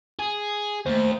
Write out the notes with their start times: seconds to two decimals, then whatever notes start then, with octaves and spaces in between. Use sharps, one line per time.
0.19 G#4
0.86 D#2 A3 C5